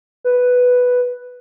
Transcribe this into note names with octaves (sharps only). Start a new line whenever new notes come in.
B4